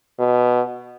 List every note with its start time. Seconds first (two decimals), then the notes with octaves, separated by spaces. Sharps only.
0.19 B2